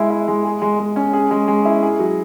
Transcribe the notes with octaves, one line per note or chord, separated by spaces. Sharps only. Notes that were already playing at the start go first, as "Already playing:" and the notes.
Already playing: G#3 E4
E4
G#3
G#4
G#3
G#3
C#4
G#4
G#3
G#3
E4
G#4
F#3